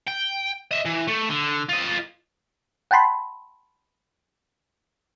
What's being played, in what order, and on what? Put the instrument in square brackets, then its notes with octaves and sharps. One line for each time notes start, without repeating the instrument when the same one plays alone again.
[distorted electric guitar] G5
D#5 E5
E3
A3
D3
F4 D#5
[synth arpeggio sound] F#5 G5 A5 B5 C6